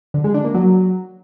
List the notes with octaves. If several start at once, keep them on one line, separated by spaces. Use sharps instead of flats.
D3
G#3
D4
A#3
F#3